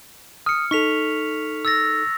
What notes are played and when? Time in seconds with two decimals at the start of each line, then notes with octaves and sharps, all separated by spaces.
0.46 D#6 F6 C#7
0.71 D#4 A4 C#6 B6 F7
1.65 E6 A6 A#6